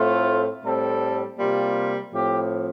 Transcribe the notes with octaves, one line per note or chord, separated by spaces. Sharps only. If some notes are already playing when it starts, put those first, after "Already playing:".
Already playing: A2 A3 C4 F4
A2 G3 C4 A4
C3 G3 A#3 F4
A2 F3 C4 G4